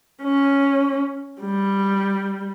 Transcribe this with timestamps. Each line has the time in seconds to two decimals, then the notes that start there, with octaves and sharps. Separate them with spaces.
0.23 C#4
1.42 G3